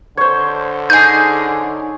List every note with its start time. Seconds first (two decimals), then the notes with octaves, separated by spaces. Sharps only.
0.17 D3 C5 C#5
0.90 D#4 G#4 G6